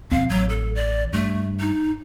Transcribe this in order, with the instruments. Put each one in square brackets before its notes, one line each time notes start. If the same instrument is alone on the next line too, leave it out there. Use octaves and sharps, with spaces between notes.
[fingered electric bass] E1 F2 C4 [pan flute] F5
[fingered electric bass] A1 [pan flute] F#3
[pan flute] A4
D5
[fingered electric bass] G2 [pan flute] A3
[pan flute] D#4